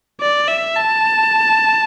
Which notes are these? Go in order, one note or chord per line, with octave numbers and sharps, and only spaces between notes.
D5
E5
A5